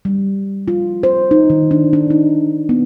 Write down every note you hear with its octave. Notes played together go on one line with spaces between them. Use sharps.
G3
F4
C5
D#4
D#3
D4
D4
D#4
B3